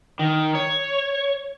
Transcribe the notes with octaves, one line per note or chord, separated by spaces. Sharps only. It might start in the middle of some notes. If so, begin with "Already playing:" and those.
D#3
C#5